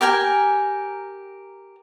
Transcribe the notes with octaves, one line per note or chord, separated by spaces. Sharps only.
G4 A#4 G5 G#5